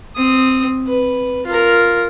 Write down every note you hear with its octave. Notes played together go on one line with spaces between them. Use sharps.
C4 D#6
B4
F4 A#4